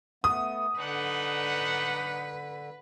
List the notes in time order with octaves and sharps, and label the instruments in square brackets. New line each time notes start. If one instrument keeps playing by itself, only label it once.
[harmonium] A3 B3 [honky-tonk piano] D#6
[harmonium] D3 [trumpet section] D4 D#4 F#5 [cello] B4